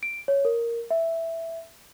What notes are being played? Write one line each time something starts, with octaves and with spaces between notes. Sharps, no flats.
D7
C#5
A#4
E5